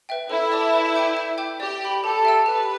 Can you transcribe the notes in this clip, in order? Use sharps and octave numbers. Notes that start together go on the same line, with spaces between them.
B4 E5 G5
E4 A4
D5 A5 D6
B4
E5 G5 D6 G6
E5
G5 D6 G6
G4 D5
G5 B5
G4 A4
E5 G5 E6
G4 B4